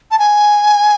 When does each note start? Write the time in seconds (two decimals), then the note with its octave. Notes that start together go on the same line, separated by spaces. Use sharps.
0.11 A5
0.19 G#5